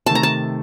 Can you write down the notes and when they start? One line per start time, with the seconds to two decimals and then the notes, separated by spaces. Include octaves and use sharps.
0.06 C3 D#3 A3 A5
0.15 A#5
0.23 A5